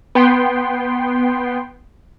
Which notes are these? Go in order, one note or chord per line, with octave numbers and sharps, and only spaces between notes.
B3 G5 C6